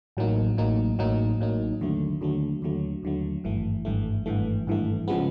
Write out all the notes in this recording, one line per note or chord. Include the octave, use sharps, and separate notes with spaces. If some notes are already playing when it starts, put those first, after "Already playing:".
A1 A2 F#3 A#3 D#4
A1 A2 F#3 A#3 D#4
A1 A2 F#3 A#3 D#4
A1 A2 F#3 A#3 D#4
D#2 D3 F#3 A3
D#2 D3 F#3 A3
D#2 D3 F#3 A3
D#2 D3 F#3 A3
G#1 G2 E3 A3
G#1 G2 E3 A3
G#1 G2 E3 A3
G#1 G2 E3 A3
C#3 F3 G#3 B3